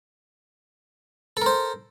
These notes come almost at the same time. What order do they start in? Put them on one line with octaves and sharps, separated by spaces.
A4 A#4 C5